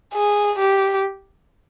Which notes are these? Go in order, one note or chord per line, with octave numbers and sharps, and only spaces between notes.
G#4
G4